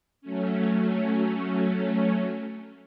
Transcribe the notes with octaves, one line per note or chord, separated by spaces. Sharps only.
F#3 A3 C#4